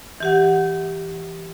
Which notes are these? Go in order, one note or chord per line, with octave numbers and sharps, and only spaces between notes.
E3 G4 F#5